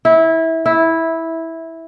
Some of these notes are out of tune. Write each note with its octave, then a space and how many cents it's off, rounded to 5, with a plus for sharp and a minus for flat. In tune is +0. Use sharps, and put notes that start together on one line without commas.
E4 -20
E4 -10